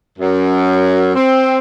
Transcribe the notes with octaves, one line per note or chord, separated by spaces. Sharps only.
F#2
C4